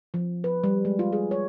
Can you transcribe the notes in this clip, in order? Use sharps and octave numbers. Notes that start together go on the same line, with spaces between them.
F3
B4
G3
G#3
F4
G#4
C#5